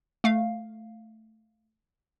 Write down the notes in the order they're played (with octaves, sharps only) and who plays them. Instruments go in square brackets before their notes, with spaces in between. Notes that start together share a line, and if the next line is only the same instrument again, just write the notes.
[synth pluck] A3 F5